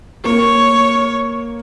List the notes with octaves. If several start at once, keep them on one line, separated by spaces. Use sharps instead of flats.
A#3 C#5